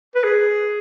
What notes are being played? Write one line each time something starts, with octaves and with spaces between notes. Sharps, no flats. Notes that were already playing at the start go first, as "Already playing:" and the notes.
B4
G#4